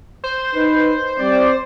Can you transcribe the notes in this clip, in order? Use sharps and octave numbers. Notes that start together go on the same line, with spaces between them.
C5
D#4 B4
G3 C4 D5